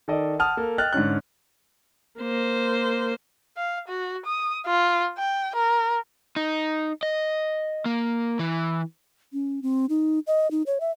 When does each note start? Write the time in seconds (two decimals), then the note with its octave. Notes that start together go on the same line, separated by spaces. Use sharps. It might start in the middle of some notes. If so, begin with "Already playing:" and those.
0.08 D#3 A4 D5 D#5
0.39 F#5 A5 D#6 F6
0.57 A#3 A4
0.78 D#5 G5 F6 F#6 A6
0.93 G#2 D3 C#4 F#6
2.20 A#3 C5
3.57 F5
3.88 F#4
4.26 D#6
4.66 F4
5.18 G5
5.55 A#4
6.36 D#4
7.03 D#5
7.86 A#3
8.39 E3
9.33 C#4
9.62 C4
9.89 D#4
10.27 D#5
10.51 D#4
10.66 C#5
10.80 E5